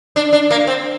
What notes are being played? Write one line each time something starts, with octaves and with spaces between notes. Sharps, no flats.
D4
D4
A#3
C4